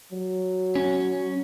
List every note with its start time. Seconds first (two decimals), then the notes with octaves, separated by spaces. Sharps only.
0.12 F#3
0.76 C#4